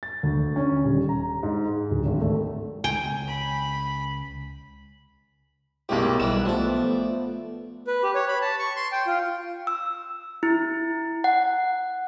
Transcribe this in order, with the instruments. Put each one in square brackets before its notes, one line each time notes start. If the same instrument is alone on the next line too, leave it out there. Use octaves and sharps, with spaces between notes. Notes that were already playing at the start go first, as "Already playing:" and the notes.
[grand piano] A6
D2
C#4
D#1
A#5
G#2
G#4
D1
G#1
A3
[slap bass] C#2 [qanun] G5 [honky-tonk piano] G#5
[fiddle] B5
[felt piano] B1 G4 [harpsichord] A2 G#3 A#3
[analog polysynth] B1 F#6 [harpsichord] E3 G3 [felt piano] E7
[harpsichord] F3 D5 [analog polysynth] A3 B3
[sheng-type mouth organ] B4
G4
C#5
B5
A5
C#6
C6
G5
F4
[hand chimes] E6
E4
F#5